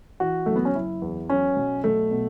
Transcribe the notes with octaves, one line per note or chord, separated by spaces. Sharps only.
E3 F#4
F#1 A3
B3
C#4
F#1 E4
E2
F#3 C#4
B1
B1 A3
B2